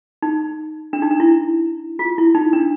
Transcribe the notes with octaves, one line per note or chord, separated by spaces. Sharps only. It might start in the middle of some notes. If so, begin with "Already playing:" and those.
D#4
D4
D#4
D4
E4
F4
E4
D#4
D4